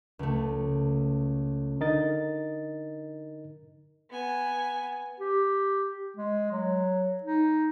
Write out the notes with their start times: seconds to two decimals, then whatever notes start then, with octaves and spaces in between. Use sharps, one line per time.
0.19 C#2 A3
1.81 D3 D#4 A#4 D#5 A6
4.10 B3 G#5
5.20 G4
6.17 G#3
6.51 F#3
7.23 D#4